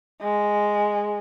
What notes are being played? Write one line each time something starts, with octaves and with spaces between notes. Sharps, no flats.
G#3